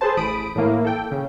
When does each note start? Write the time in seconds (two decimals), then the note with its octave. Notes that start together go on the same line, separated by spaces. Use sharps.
0.01 G#4 A4 B4 C5 A5
0.17 A1 B5 D#6 D7
0.55 A2 E3 A3 A#3 E4
0.85 A4 G5
1.11 C#3